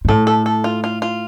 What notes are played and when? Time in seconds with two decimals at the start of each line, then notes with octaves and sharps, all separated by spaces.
0.05 A#2
0.09 A2 A4
0.27 A4
0.46 A4
0.64 F4
0.84 F4
1.02 F4